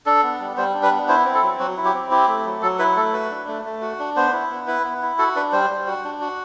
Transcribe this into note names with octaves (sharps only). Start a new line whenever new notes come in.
D4 A4
B3
G3
G3 C5
D4
B4
B3
E4 C5
C4
A4
F#3
F#3 F#4
E4
G4
C4
E4 G4
A3
F#3
F#3 A4
E4 B4
A3 A4
F#4 B4
D4
A3
A3
F#4
D4
B3 C5
E4
B3
E4 B4
B3
E4
F#4 A4
D4 B4
G3 C5
G3
F#4
D4
F#4